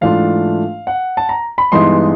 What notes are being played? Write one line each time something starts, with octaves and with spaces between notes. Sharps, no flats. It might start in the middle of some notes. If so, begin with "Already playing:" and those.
G#2 E3 A3 D4 F4 F5
F#5
A5
A#5
B5
G2 E3 G#3 B3 D#4 C6